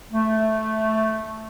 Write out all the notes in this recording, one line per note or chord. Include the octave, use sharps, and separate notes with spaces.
A3